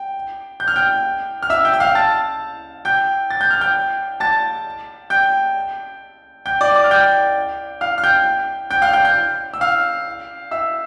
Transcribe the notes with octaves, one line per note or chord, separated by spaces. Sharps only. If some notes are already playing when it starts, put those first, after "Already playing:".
Already playing: G5
G6
F6
G5 G6
F6
E5 E6
G5 G6
E6
F5 F6
A5 A6
G5 G6
A6
G6
F6
G5 G6
A5 A6
G5 G6
G5 G6
D5 D6
D5 D6
F6
G5 G6
F5 F6
F6
G5 G6
G5 G6
F5 F6
G5 G6
G5 G6
E6
F5 F6
E5 E6